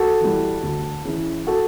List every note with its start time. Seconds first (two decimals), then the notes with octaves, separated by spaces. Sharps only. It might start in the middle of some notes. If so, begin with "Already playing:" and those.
Already playing: F#4 A4
0.21 E3 G3
0.63 D2
1.05 C#3 E3
1.47 F#4 A4